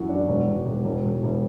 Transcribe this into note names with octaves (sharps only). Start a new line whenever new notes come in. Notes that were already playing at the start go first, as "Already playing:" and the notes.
Already playing: F#2 E3 F#4
D4
E1
E1
E1
E1
E1
E1